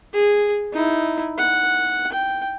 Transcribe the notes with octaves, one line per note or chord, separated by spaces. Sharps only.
G#4
D#4 E4
F#5
G5